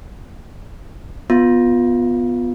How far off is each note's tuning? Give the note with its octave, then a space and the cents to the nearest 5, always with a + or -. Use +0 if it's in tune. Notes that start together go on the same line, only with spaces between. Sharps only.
B3 +0 F4 +15